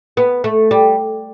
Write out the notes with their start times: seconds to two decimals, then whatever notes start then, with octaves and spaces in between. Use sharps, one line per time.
0.17 B3
0.44 A3
0.71 G3